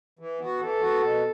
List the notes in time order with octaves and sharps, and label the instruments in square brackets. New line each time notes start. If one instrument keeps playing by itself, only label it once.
[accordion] E3
B3 F#4
[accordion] E3 [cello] A4
[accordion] B3 F#4
B2